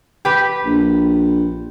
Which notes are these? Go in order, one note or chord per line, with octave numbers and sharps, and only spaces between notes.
G4 B4
A#1